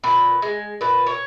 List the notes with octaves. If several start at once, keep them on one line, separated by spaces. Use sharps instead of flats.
A#2 B4
G#3
A#2 B4
C#5